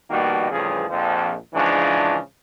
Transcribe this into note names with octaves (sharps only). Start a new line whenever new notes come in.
A#1 B2 D#3 G3 A#3 F#4
A1 G2 C#3 F3 G#4
A#1 F2 F3
G#2 C#3 E3 F3 D4